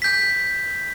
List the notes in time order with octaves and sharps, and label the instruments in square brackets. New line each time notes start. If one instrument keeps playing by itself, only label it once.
[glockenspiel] G6 B6